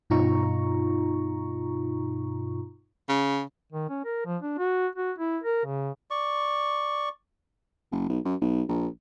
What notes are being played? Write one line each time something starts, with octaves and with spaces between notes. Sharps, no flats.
G2 B2 D#4 F4 A#5 C#6
C#3
D#3
C#4
A#4
F3
D4
F#4
F#4
E4
A#4
C#3
D5 C#6
F#1
B1
F#2
B1
A#1